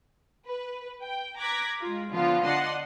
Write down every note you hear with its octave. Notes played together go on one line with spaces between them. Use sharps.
B4
G5
A#5 D6 F#6 G#6 A#6 B6
G#3 F4
D3 F3 B3 F4
D5 D#5 F#5 A5 C6